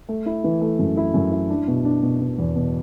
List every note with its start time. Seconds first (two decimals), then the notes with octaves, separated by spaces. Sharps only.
0.09 A3
0.26 E4
0.44 E3
0.61 A3
0.79 F#2
0.97 E4
1.14 F#2
1.32 E4
1.50 D4
1.67 B2
1.85 D4
2.02 B2
2.21 B2
2.38 E2
2.55 B2